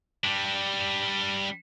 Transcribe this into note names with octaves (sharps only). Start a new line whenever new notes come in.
G3 D4